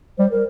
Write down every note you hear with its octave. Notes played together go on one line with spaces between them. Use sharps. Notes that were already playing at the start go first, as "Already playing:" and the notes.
G3 C5
A#4